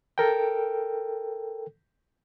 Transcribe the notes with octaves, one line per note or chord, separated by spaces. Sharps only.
A4 A#4 G5